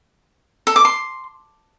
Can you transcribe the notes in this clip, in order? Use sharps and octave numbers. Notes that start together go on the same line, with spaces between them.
A4
D6
C6